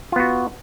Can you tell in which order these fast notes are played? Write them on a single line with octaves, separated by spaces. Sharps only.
F4 B3 F#4